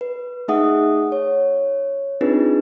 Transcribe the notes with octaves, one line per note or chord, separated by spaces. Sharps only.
B4
A3 D#4 G#4 E5 F#5 D#6
C#5
C4 D4 D#4 F4 G#4 B4